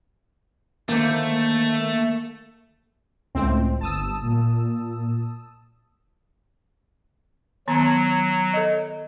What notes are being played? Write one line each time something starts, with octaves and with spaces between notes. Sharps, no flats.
D3 D#3 A3 A#3 C5
C#2 A2 C4
G1 A5 D#6 E6
A#2
D#3 F#3 B3 A#5
A4 D#5